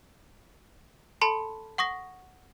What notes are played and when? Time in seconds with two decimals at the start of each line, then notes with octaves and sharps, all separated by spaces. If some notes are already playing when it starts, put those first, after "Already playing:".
1.21 A4 A5 B5 C6 C#7
1.78 F#5 C#6 D#6 A#6